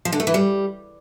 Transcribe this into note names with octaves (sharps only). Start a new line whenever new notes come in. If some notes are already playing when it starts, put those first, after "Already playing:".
F3
D3
A3
E3
G3